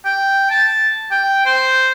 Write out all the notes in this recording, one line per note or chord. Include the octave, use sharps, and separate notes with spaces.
G5
A5
G5
C5